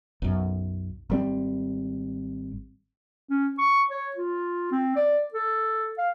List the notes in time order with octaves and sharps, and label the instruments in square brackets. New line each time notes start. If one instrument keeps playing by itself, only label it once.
[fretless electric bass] B1 F#2
[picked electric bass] G#1 G3 C4
[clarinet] C#4
C#6
C#5
F4
C4
D5
A4
F5